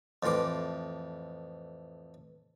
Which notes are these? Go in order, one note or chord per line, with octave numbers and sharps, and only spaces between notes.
F2 A2 E3 C6 D6